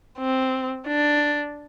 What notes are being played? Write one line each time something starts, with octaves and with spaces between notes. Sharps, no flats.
C4
D4